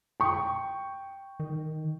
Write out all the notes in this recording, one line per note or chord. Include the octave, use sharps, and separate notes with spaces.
G5 C#6
D#3